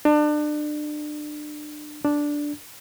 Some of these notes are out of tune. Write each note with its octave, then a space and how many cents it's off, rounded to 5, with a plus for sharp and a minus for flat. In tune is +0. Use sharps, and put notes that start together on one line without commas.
D4 +30
D4 -5